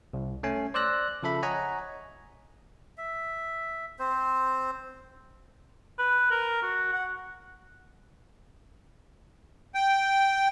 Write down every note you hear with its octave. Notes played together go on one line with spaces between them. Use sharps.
C2
A3 C#4 G#5
C5 D5 E6 F#6 A#6
C#3 F3 A4 E5 B5
C#5 D#5 F#5 G#5 A#5
E5
C4 C5
B4
A#4
F#4
F#5
G5